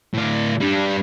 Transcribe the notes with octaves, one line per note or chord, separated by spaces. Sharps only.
A2 D5
G3 D4